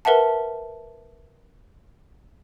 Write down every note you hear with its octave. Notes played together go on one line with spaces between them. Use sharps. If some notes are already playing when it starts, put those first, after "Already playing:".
A#4 B4 E5 F#5 A5